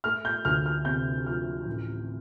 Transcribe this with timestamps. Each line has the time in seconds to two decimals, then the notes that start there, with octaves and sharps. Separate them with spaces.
0.04 A3 F6
0.25 G6
0.45 D2 F6
0.66 F6
0.85 C3 G6
1.26 F3 F6
1.66 A1